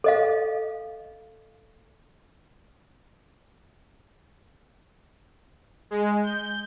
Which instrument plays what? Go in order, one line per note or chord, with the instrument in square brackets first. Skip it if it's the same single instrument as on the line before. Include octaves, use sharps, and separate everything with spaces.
[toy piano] A4 D#5 F5
[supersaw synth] G#3
G6